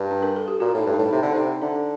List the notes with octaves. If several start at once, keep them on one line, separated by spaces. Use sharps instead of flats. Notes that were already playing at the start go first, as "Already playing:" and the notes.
Already playing: G2
D4
A#4
A4
G4
A#2 F#4
A2 D#4
G2
A2 D#4
C3 D#4
D3
C3 D#4
D3 D4